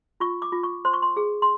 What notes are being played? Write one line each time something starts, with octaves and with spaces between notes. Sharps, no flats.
F4 C#6
D6
F4
C#6
C5 C6
C#6
C6
G#4
C6